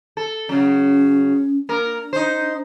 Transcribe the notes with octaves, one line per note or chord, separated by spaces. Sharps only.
A4
C#3 F#3 C#4
A#3 D4 A#4
D#4 C5